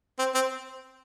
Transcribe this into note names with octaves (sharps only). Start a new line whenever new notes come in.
C4
C4